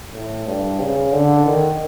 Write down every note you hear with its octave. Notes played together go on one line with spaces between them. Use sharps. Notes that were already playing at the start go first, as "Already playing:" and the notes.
A2
G2
C#3
D3
D#3